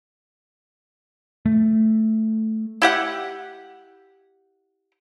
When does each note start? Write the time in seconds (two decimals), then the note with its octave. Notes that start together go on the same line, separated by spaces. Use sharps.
1.46 A3
2.82 E4 G4 F#5